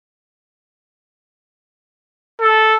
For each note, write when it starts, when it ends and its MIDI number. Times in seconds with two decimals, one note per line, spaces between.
2.41 2.76 69